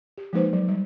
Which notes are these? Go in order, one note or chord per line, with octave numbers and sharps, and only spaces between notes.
G4
F3 G#3 A#3 D#4 B4 C5
F#3
G3